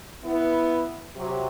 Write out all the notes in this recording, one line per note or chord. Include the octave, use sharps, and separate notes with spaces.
B3 E4
C3 F#3 G4